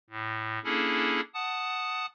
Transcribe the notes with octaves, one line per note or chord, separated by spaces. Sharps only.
A2
A#3 C#4 D4 E4 G#4 A4
F#5 A5 D#6